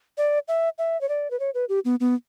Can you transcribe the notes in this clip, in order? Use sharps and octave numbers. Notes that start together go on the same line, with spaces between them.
D5
E5
E5
C#5
D5
B4
C#5
B4
G4
B3
B3